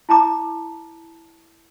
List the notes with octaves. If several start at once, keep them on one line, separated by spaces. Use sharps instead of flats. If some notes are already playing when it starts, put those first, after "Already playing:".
E4 A5 A#5 D6